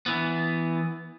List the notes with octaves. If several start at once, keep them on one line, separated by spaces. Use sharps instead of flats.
E3 B3